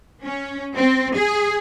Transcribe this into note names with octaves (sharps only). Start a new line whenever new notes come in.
C#4
C4
G#4